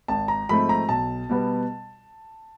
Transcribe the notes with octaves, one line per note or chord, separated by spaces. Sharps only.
G#1 A5
A#5
G#2 F3 A3 C4 B5
A#5
B1 A5
B2 G3 B3